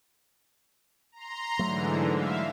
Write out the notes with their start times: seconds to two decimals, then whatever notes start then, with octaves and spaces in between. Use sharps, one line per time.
1.12 A#5 C6
1.59 G#2 D3 E3 F#3 A3
2.11 E5 F5